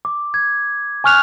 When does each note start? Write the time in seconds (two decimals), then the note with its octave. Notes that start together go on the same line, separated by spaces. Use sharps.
0.05 D6
0.34 G#6
1.04 G#5 C#6 F6 F#6 F7